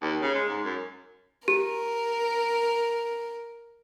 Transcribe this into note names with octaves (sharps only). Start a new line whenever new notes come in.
D#2
C#3
G#3
G#2
F#2
G4 A#4